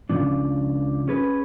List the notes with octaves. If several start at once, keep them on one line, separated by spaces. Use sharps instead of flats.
C#2 F#2 C#3 F3 D4
C#4 G#4 B4